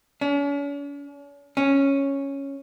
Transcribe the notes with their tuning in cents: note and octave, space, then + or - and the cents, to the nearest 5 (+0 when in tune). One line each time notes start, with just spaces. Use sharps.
C#4 +45
C#4 -5